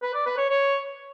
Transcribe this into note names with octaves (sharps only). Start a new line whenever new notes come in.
B4
D5
B4
C#5
C#5